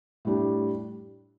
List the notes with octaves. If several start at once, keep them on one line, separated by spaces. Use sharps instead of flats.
A2 G3 D4